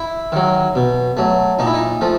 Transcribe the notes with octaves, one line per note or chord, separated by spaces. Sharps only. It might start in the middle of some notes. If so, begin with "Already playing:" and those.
Already playing: E4
D#3 F#3
B2
F#3 A3
A#2 D#4
E4
D#4
F3 A3